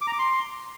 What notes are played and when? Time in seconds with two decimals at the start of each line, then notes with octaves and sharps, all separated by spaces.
0.01 D6
0.07 A#5
0.13 D6
0.19 C6